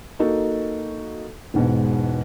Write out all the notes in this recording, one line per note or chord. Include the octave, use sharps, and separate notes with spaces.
A#3 D#4 F#4 A4
E1 G#2 B2